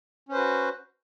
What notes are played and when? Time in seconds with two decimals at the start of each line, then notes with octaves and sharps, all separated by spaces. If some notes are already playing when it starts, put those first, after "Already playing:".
0.29 C#4
0.32 C5
0.34 B4
0.37 F#4